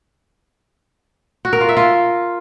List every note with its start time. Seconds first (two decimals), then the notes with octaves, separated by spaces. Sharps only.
1.45 F#4
1.53 A#4
1.61 F4
1.69 E5
1.77 F4